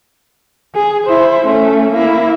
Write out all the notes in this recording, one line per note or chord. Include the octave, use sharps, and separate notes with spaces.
G#4
E4 C5
A3 C#4
A#3 E4